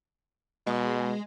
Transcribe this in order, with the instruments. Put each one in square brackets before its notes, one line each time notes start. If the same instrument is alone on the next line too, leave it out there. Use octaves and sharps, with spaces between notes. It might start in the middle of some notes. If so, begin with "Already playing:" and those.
[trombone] B2 [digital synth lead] G#3